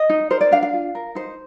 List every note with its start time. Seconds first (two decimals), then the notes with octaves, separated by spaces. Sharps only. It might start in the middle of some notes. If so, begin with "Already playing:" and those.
Already playing: D#5
0.10 D#4
0.30 A#4 C5
0.41 D5
0.51 D4 F5
0.63 F5
0.73 F4
0.95 A#4
1.15 D#4 C5